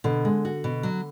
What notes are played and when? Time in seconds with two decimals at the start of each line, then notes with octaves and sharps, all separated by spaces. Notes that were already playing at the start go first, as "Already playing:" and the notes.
0.04 B2 D3
0.25 G#3
0.45 F#4
0.64 B2
0.83 F#3